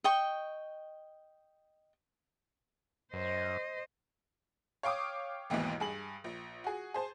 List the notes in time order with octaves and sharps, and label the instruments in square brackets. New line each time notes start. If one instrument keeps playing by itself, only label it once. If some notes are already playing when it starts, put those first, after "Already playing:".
[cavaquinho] D#5 G5 C#6
[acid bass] F#2 [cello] C5 D#5
[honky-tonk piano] C#5 F5 G5 D6 D#6
A1 D#2 G#2 B2 E3
G2 G#4 F#7
A#1
F#4 G#4
G#4 C5 A5